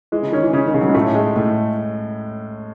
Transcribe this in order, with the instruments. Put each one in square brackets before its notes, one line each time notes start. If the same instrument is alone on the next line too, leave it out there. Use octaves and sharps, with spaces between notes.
[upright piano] E3 [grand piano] G#3
[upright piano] C#3
[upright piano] D#3 [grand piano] C#4
[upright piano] E3
[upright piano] C#3 [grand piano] C#4
[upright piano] D#3
[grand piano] C#3
[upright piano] F#3
G#3
[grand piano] A2 [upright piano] A3
[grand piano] G#3
A2